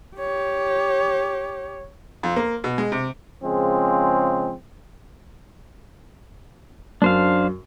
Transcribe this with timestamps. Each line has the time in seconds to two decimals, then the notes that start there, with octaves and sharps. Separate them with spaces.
0.16 G4 C#5
2.23 F2
2.36 A#3
2.64 B2
2.78 G#3
2.92 C3
3.43 C#3 F3 G#3 C4
7.02 F#2 D4 C5 F5